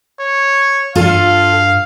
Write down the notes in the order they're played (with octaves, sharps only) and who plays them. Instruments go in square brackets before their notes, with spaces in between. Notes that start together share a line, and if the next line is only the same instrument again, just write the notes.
[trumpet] C#5
[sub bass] G2 [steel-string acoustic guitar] F4 A4 [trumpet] F5